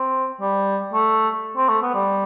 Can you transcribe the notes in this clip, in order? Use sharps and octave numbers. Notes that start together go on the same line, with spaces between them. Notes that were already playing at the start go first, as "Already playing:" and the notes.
Already playing: C4
G3
A3
C4
A3
B3
G3